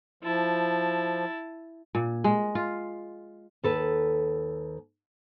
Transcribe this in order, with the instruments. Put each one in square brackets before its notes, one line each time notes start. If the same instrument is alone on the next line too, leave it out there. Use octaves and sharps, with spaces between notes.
[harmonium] F3 [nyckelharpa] E4 A5
[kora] A#2
G#3
F4
[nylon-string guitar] D#2 A4 B4